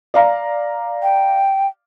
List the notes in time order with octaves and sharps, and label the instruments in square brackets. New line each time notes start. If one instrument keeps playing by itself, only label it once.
[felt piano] D5 F5 A#5
[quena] G5